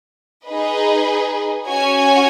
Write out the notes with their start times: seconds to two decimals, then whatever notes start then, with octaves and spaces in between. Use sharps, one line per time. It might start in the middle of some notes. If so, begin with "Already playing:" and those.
0.46 D#4 G#4 B4 D#5
1.67 C#4 F#4 C#5 G#5